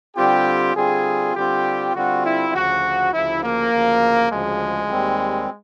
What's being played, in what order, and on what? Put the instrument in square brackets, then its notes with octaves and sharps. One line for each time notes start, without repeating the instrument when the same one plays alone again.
[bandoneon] D3 G3 C4 F4 [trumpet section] G4
[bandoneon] D3 G3 C4 F4 [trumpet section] G#4
[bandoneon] D3 G3 C4 F4 [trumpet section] G4
[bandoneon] D3 G3 C4 F4 [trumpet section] F#4
[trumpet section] E4
[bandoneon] D2 C#3 F3 [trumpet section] F#4
[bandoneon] D2 C#3 F3 [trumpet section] E4
[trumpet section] A#3
[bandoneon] D2 C#3 F3
[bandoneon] D2 C#3 F3 [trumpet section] G#3
[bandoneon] D#2 D#3 G3 C4